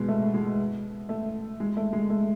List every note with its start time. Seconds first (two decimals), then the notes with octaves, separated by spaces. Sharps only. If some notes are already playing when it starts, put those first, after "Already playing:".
Already playing: B2 G#3
0.09 A3
0.34 G#3
1.09 A3
1.60 G#3
1.77 A3
1.93 G#3
2.10 A3